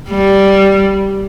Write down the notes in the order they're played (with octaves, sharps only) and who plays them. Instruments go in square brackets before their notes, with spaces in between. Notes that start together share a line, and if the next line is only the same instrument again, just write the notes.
[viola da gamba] G3